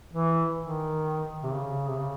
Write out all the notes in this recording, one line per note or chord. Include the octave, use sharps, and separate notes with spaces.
E3
D#3
C3
C#3
C3
C#3